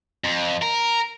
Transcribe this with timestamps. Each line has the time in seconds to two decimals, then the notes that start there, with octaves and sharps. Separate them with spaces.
0.24 F2
0.63 A#4